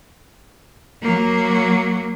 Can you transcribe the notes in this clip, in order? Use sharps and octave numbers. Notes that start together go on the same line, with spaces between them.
F#3 A#3